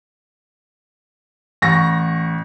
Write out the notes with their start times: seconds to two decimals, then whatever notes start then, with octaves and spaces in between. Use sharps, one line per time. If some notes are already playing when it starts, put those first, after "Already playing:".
1.62 A1 C#6 A#6